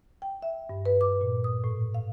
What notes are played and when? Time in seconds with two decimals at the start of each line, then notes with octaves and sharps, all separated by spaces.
0.22 G5
0.42 E5
0.69 G2
0.86 B4
1.01 D6
1.21 A#2
1.44 D#6
1.64 A2
1.94 F5